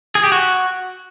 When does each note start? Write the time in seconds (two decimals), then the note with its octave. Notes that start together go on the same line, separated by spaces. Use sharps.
0.15 G#4
0.24 G4
0.32 F#4